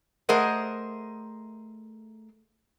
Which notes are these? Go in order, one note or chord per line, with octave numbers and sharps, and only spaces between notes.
A3 G#4 A#4 C5 D#5 F#5